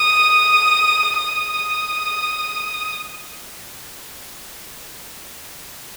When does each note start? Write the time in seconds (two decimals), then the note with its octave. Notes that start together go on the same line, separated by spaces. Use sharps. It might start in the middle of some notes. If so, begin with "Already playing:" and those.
Already playing: D#6
1.17 D#6